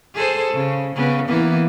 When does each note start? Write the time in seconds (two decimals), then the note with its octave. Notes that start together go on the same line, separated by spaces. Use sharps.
0.14 G#4 A4 C5
0.53 C#3
0.95 C#3 B3
1.28 E3 A#3 B3